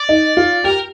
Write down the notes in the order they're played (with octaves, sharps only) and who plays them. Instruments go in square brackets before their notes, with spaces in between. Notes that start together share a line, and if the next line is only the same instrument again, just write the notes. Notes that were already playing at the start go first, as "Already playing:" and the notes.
Already playing: [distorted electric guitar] D5
[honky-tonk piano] D#4
F4
[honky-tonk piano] G4 [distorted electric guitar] A#4